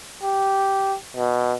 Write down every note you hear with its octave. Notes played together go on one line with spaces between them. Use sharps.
G4
B2